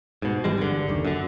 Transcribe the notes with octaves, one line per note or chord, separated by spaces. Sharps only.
G#2 B2
G#1 E3 G3 G#3
G2 D3
F#1 D#2
F#2 D3